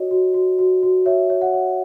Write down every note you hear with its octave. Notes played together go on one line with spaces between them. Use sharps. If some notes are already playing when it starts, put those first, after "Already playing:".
Already playing: F#4 C#5 D#5
F#4
F#4
F#4
F#4
C#5 E5
C#5
F#5
C#5